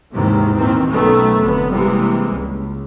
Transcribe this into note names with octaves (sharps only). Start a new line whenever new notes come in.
D#2 G#2 C3 D#3 E3
A#2 D#3 E3 C4
B1 D#3 F#3 A3 B3 C#4
F1 D3 B3
C3 E3 G3 G#3 A#3
C#2